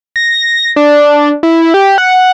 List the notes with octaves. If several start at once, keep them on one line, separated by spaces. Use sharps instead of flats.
A#6
D4
E4
G4
F#5